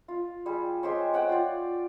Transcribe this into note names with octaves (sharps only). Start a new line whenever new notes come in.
F4
G3 G#4
G#3 G4 C5 C#5
C#5 F#5 G5
F4 D5